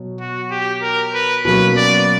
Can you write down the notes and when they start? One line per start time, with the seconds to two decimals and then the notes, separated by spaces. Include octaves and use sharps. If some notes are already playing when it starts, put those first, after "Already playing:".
Already playing: B2 F#3
0.20 F#4
0.51 G4
0.82 A#4
1.14 B4
1.45 B2 F#3 A#3 C#4 B4
1.77 D5